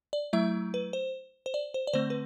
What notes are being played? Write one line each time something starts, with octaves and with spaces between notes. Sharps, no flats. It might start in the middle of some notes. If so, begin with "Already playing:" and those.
D5
F#3 A3 E4 E5
B4
C5
C5
D5
C5
D5
D3 A3 C4 C5
B4